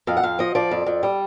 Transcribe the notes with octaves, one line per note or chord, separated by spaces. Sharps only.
F2 F5
F#5
F2 F5
F3 D#5
F3 D5
F2
F2
G3